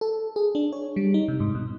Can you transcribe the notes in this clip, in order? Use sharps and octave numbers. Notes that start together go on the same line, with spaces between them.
A4
G#4
D4
C#5
G3
D#4
C3
G#2
B2